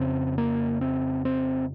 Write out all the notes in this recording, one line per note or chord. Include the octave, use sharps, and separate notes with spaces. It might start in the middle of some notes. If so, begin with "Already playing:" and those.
Already playing: F2 C#3 C4
A#3
C4
C4